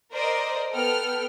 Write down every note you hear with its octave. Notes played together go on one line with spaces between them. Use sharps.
A#4 C5 D5 D#5
B3 A4 G5 F6